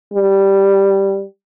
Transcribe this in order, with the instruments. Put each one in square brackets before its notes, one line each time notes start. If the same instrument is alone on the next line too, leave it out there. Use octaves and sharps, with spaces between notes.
[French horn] G3